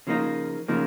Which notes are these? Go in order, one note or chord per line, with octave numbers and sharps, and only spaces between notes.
C#3 F3 A#3 D#4
C#3 F3 A#3 D#4